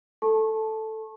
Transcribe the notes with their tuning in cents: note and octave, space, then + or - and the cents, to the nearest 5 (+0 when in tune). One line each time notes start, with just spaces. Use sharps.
A4 +0 A5 -15 C#6 -30